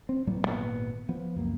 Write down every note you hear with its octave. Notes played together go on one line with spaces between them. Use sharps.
C4
A2 F#3 G3 B3
G#1 G2 A#2 B3
F3 B3
C#2 F#2 A#3